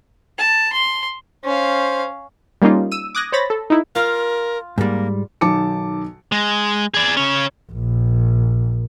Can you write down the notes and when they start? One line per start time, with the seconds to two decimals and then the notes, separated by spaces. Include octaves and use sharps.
0.38 A5
0.73 C6
1.44 C#4 C5 F5
2.62 G3 A#3 C#4 D#4 F4
2.92 E6 D#7
3.15 D6 D#6 F#6 G#6 A#6
3.32 C5 C#5 B5 A6 A#6
3.50 A4
3.70 D#4 E4
3.95 F4 A#4 F5
4.78 G#2 G3 A#3
5.41 B1 D#3 A5 D6 C#7
6.32 G#3
6.94 G#4 D5
7.17 C#3 C#4
7.72 A#1